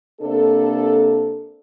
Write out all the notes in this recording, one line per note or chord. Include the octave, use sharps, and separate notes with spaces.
C3 A#3 D4 A4